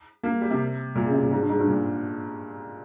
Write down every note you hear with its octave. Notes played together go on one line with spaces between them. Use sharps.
A#3
G3
C3
A#2
C#3
C3
A#2
G#2
G2
G#2
G2
A#2